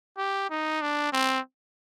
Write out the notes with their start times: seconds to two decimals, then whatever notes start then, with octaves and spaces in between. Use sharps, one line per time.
0.18 G4
0.50 D#4
0.82 D4
1.12 C4